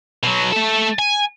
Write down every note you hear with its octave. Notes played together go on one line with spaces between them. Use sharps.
B2 F#3
A3 A4
G#5